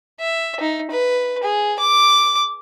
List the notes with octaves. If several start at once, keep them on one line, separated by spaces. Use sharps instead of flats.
E5
D#4
B4
G#4
D6